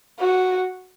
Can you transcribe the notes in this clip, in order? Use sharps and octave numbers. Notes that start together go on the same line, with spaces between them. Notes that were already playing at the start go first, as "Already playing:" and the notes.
F#4